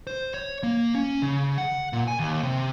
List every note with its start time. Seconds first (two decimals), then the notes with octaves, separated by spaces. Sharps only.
0.07 C5
0.34 C#5
0.63 A#3
0.95 C#4
1.22 C#3
1.58 F#5
1.93 A#2
2.08 G#5
2.19 D#2
2.43 C3